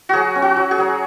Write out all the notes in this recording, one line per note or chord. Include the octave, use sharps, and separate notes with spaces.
F#3 F#4 G#4
C#4
F#4
F#3
G#4
F#3